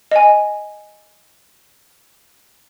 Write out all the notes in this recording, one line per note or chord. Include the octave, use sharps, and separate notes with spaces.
D#5 G#5